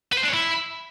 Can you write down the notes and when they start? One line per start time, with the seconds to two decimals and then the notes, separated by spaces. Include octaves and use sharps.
0.13 B4
0.18 C5
0.23 D4
0.28 C#5
0.34 E4